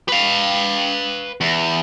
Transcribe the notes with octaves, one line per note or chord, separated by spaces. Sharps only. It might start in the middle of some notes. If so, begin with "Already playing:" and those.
B4 F5
E2